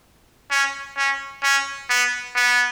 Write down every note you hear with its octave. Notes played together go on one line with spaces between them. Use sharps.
C#4
C#4
C#4
B3
B3